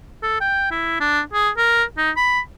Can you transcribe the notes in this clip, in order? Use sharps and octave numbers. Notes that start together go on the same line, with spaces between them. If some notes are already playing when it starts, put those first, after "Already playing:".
A4
G5
E4
D4
G#4
A#4
D#4
B5